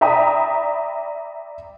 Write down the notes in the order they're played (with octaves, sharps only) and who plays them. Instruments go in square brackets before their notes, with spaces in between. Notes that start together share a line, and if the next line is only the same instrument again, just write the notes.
[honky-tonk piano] D5 E5 G5 A#5 B5 D#6